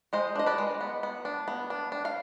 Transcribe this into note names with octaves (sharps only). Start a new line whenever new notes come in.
G#3 C5 D#5
D4 D#5
B4 D5
G#3
B3
B3
D4
B3
D4
D4
F5